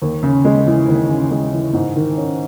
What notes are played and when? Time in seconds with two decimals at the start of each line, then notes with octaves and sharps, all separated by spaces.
0.02 D#2
0.23 C#3
0.44 G#3
0.67 E3
0.88 D#2
1.09 C#3
1.30 G#3
1.53 E3
1.73 G#2
1.96 D#3
2.18 C#4